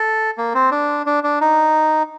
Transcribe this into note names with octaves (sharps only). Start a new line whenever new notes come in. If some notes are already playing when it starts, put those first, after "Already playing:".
Already playing: A4
A#3
C4
D4
D4
D4
D#4